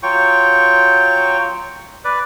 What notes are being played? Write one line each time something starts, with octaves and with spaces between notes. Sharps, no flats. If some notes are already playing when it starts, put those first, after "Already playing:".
F#3 F4 G5 C#6
B4 D5